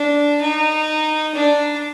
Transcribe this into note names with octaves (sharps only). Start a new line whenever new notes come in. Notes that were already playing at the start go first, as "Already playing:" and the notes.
Already playing: D4
D#4
D4